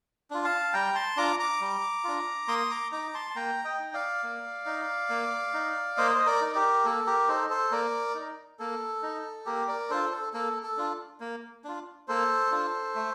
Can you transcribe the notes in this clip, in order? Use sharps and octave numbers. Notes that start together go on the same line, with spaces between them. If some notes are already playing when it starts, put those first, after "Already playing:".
D4 F4
F5 A5
G3 G5 A#5
A5 C6
D4 F4 A#5 D6
A#5 D6
G3
D4 F4
A#3 C6 D#6
A#5 D6
D#4 A#5 D6
A5 C6
A5
A#3 G5 A#5
D#5 G5
D#4
D5 F5
A#3
D#4
A#3
D#4
A#3 C5 D#5
C5
A#4 D5
D#4
G4 A#4
A#3 A4
G4 A#4
D#4 A4 C5
A4 C5
A#3 A#4 D5
D#4
A#3 A4
D#4
A#3 G4 A#4
A#4 D5
D4 F4 A4 C5
A4
A#3 A4
A4
D4 F4
A#3
D4 F4
A#3 A4 C5
D4 F4
A3